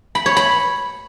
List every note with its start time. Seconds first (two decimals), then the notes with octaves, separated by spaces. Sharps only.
0.15 B5
0.26 C#5
0.37 B5